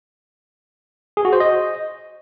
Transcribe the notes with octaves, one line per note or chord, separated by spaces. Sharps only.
G#4
F#4
C5
D#5